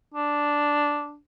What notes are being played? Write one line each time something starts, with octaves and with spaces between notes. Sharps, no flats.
D4